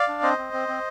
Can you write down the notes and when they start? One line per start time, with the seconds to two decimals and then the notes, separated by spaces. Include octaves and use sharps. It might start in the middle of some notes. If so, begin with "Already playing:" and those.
Already playing: D5 F5
0.08 D4
0.23 C4 C5 D#5
0.38 C4
0.53 C4
0.68 C4